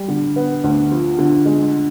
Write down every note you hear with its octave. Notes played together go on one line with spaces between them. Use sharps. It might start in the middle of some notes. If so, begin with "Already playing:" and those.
Already playing: G3
D3
B3
D2
F3
D3
G#3